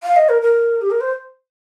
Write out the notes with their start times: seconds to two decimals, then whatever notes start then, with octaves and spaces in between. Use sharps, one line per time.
0.03 F5
0.16 D#5
0.29 A#4
0.42 A#4
0.81 G4
0.90 A#4
1.00 C5